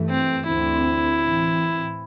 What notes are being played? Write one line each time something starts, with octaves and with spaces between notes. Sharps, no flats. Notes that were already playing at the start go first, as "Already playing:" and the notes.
Already playing: G2 E3 A3
C4
D2 D3 C4 E4
A2 E3 C4